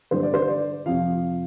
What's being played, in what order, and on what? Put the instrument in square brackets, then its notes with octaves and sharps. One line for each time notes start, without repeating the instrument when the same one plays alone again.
[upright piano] G2 D3 G3 C5
D5
C5
D5
F2 C3 F3 F5